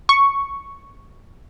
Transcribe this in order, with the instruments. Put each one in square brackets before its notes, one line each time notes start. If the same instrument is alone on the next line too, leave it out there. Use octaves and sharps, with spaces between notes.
[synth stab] C#6